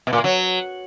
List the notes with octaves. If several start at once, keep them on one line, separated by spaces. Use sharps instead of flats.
B2
A#2
A#3
F#3